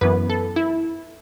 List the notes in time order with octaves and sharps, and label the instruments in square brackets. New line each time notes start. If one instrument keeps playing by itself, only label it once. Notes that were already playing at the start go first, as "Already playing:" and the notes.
[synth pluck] F#2 E3 B3 B4
A4
E4